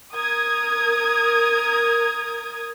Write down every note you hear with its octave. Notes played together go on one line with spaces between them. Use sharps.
A#4 D#6 G#6